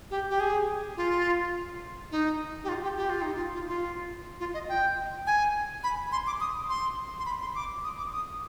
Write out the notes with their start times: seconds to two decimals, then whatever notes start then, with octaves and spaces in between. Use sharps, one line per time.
0.11 G4
0.30 G4
0.40 G#4
0.97 F4
2.12 D#4
2.64 G4
2.69 F4
2.83 G4
2.97 G4
3.10 F4
3.22 D#4
3.34 F4
3.54 F4
3.68 F4
4.40 F4
4.54 D#5
4.69 G5
5.27 G#5
5.84 B5
6.12 C6
6.27 D6
6.40 D#6
6.70 C6
7.19 C6
7.26 B5
7.41 C6
7.55 D6
7.84 D#6
7.98 D6
8.12 D#6